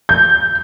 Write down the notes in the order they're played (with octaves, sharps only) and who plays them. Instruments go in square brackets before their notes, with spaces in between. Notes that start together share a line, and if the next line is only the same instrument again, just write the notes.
[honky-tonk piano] G6